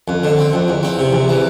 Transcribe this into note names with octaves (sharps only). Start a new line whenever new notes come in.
F2
D3
C4
F2
E2
C4
C3
E2
E3